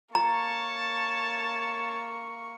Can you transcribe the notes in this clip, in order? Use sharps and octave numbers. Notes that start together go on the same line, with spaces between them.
A#3 C#5 A5 A#5 C#6